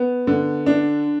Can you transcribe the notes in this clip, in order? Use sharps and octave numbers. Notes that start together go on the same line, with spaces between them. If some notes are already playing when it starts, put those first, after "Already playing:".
Already playing: B3
D3
D4